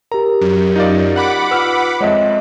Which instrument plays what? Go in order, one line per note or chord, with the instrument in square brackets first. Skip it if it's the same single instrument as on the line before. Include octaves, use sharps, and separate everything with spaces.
[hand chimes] G4 A#4 [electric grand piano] A#5
[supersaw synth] F#2
[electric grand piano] D#4 F4 D5
[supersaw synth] F#5 B5 D6
[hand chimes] F4 B4 [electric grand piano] E6 F6
[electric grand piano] F2 G#3 [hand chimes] C#5 D#5 E5